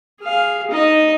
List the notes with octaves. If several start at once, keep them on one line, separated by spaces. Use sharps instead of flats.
G#4 F5
D#4 D#5